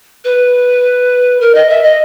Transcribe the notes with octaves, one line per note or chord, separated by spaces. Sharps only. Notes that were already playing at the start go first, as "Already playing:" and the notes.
B4
A#4
D#5
E5
D#5